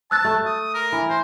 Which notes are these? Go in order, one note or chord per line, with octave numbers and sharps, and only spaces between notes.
A5 E6 F#6 A6
A3
D#6
A#4
E3
C5